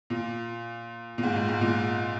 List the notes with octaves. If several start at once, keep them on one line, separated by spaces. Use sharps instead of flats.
A#2
A#2
G#2
G#2
G#2
A#2